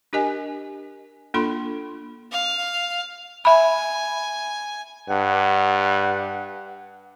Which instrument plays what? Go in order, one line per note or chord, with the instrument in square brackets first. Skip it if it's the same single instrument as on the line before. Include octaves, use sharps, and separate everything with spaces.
[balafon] D4 G4 A#4 D#5 G#5
A#3 D4 F4 A4 B5 C6
[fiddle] F5
[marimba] E5 B5 [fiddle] G#5
[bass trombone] G2 [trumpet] F#5